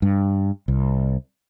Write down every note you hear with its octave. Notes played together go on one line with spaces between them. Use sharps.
G2
C2